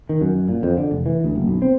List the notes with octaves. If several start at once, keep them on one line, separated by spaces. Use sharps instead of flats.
D#3
F#2
A#2
F2
D3
F1
E3
D2
F#1
B1
C4